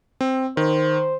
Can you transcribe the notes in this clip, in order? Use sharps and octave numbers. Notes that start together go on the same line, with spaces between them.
C4
D#3 C5